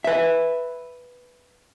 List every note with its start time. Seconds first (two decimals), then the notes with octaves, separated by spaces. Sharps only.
0.04 B4 E5